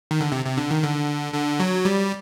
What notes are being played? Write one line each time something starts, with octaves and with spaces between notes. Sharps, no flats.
D#3
D3
C3
C3
D3
D#3
D3
D3
F#3
G3